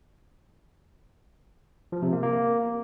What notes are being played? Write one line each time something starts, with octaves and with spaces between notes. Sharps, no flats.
F3
C3
A#3
A#3